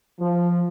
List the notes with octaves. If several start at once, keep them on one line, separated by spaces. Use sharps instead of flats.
F3